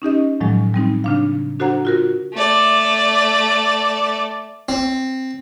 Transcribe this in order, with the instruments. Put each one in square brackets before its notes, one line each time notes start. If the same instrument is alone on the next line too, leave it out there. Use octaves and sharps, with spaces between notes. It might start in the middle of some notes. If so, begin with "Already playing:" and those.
[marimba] C#4 D#4 G4 D#5
A2 D#3 F3 F#3 G#3
G3 C4 D#4
C#3 D4 F5
D4 F#4 A4 C5 F#5 A#5
F4 F#4 A#4
[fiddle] A3 D5
[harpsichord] C4